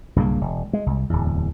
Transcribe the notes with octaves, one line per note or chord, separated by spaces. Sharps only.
B1 G2 C#3 A#3
E1
G#3
C2
D1 E2